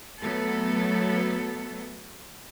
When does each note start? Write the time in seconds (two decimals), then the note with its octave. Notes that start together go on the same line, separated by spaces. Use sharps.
0.22 F#3 A3 B3 A4